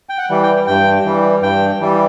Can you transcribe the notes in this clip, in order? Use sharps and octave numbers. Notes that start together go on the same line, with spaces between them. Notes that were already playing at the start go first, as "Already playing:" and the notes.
G5
F#5
E3 G3
G5
G2 G5
E3 G3
G2 G5
E3 G3